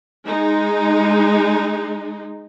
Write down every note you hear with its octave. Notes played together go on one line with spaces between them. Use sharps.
G#3 D#4